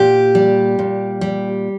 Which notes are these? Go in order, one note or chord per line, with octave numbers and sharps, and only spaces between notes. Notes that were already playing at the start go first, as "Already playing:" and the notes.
Already playing: A#2 G4
G3
A#2
G3